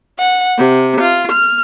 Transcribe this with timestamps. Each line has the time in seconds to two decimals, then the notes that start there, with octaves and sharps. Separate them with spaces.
0.19 F#5
0.57 C3
1.00 F4
1.32 F6